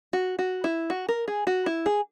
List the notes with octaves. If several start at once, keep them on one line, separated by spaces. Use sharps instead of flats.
F#4
F#4
E4
F#4
A#4
G#4
F#4
E4
G#4